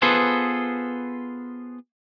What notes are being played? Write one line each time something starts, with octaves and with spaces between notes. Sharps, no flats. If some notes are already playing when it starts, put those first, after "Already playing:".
B3 F4 G#4 A4 B4 C5